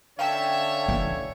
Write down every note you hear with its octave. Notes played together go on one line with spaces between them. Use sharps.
D3 C#4 C#5 E5 F5 G5 A5
E3